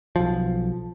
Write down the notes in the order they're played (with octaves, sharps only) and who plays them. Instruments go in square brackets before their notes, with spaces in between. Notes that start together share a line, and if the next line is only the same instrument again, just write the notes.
[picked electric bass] B1 F3